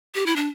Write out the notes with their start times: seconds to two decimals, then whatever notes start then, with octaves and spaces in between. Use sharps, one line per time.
0.15 G4
0.26 E4
0.36 D4